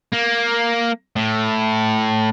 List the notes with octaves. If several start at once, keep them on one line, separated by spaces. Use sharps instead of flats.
A#3
A2